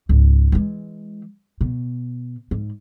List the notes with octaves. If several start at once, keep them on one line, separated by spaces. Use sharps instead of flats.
C#2 G#2
E3 G#3
B2
G#2